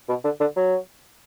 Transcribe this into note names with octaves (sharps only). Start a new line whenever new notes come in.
B2
D3
D3
F#3